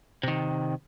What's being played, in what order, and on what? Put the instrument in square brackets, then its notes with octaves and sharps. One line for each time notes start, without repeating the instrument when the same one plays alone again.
[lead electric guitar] C3 D#3